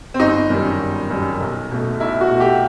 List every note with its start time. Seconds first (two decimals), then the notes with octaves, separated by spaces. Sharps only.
0.14 C4
0.20 G1 D#4
0.50 F#2 D#3 G3
0.80 G1
1.10 F#2 D#3 G3
1.41 B1
1.71 B2 A3
2.00 B1 E4
2.21 F#4
2.31 B2 A3
2.40 G4